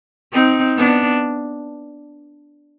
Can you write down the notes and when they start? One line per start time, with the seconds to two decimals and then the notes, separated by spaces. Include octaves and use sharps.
0.33 C4 D#4
0.77 B3 D4